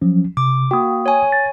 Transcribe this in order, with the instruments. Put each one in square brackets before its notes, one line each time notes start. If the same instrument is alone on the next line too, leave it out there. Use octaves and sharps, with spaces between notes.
[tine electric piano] F3 F#3 C#4
[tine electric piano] C3 [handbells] D6
[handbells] A#3 F#4 [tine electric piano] G5 D#6
[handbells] C#5 G#5
[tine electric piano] A6